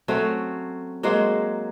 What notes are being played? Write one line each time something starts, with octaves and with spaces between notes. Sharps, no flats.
F#3 A3 C4 C#4
F#3 G#3 A#3 C5